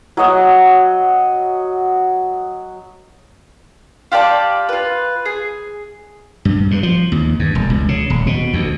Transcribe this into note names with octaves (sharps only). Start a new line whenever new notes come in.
F#3 F#4 D#5 F#5
F4 G4 D5 A5
F4 B4
G#4
G2
G2
F3
D#2
G2
E1
C#2
C#3
D#1
B2
D2